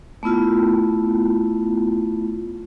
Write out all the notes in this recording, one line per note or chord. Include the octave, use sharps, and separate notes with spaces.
A3 B3 E4 F4